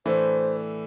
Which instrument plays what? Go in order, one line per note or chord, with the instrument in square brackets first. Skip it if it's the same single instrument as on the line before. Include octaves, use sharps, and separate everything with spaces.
[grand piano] A2 E3 A3 D4 [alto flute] C5